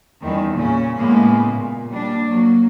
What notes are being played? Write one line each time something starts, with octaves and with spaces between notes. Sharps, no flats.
E2 D#3 G3 C#4
A#2 C#3 C#4
A2 C#3 G#3 A#3 B3
A#2
G3 A#3 D4
F#3 A#3